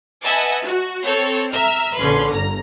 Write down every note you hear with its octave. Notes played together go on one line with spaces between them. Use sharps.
B4 D#5 E5 F#5 G#5 A5
F#4
C4 A4 C#5
E5 A#5 F6
A#1 D3 C#4 B4 C6
G1 A#5